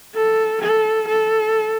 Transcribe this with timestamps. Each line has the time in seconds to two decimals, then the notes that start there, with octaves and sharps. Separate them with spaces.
0.15 A4
0.62 A4
1.08 A4